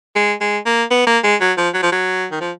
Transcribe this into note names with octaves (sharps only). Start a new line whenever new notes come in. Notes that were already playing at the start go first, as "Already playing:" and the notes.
G#3
G#3
A#3
B3
A#3
G#3
F#3
F3
F#3
F3
F#3
D#3
F3